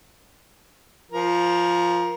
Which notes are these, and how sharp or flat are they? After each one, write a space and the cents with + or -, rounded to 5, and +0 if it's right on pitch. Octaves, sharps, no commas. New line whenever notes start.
F3 +0 A#4 +20